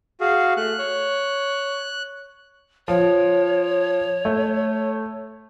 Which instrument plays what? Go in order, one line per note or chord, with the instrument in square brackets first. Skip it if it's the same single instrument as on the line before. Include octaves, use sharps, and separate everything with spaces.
[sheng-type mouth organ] F#4 F5 [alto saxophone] G#4
[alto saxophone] A3 [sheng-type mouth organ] F#6
[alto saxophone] C#5
[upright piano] F3 [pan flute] C#5
[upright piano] A3